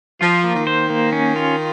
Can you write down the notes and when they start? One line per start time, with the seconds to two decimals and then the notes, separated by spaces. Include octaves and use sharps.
0.21 F3 F4
0.44 A#3
0.55 D#3
0.67 C5
0.90 A#3
1.13 C#4
1.36 F4